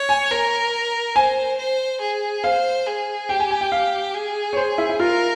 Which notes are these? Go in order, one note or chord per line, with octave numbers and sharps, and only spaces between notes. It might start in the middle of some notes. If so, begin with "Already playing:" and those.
Already playing: C#5
G#5
A#4 A#5
C5 G#5
C5
G#4
C5 F5
G#4
G4 G5
G#5
G#5
G5
F5
G#4
C#5
C5
E4
E4
F4 A#4